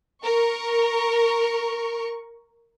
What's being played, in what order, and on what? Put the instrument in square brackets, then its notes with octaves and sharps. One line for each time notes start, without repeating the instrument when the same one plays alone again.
[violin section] A#4 C#6